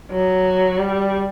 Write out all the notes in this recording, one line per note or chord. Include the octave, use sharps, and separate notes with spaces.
F#3
G3